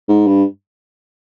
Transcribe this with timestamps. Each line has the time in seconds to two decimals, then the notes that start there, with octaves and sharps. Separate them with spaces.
0.09 G#2
0.27 G2